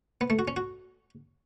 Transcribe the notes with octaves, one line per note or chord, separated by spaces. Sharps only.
B3
A3
F#4
C#4
F#4